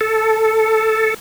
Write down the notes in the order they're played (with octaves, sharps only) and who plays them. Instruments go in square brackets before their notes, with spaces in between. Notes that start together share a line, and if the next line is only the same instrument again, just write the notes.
[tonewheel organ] A4